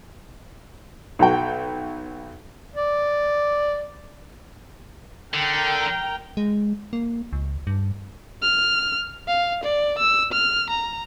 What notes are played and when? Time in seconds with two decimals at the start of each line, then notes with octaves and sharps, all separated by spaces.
1.19 B1 F#4 G5
2.76 D5
5.34 D3 A#4 G5 A#5
6.37 G#3
6.93 A#3
7.33 C#2
7.67 G2
8.42 F6
9.28 F5
9.64 D5
9.98 E6
10.32 F6
10.70 A#5